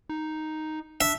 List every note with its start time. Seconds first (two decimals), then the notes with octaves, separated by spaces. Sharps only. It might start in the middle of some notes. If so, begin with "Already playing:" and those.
0.09 D#4
1.01 D4 E5